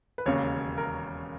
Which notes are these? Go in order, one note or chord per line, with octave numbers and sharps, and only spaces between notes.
B4
E1 D#2 C#3 C#5
A#4